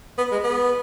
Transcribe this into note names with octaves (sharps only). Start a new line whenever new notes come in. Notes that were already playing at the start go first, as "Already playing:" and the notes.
B3
G#3
B3